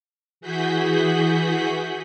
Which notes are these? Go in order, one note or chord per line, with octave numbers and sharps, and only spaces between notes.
E3 F#4 G#4 F#5 G6 B6